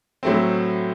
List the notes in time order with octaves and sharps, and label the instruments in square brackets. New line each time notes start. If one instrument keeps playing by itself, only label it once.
[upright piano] A2 F#3 A3 C4